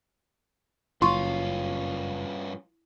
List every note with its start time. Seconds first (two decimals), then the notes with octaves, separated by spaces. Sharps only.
1.02 F#1 G2 C#4 F4 C6 C#6